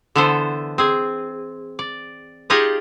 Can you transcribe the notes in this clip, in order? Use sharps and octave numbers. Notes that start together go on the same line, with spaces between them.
D3 E3 B3 A4 C5
C4 G#4
D5
D#4 F4 G4 G#4 D5 D#5